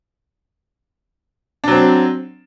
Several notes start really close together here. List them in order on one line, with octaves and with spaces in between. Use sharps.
D4 F#3 C4